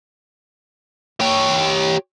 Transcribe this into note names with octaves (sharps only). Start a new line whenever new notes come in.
G4 C#5